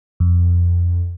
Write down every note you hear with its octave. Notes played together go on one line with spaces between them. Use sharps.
F2